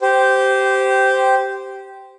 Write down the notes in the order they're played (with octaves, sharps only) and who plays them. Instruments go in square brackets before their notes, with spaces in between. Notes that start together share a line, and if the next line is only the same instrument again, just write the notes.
[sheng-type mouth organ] G4 C5